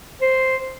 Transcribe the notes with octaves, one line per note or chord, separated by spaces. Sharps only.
C5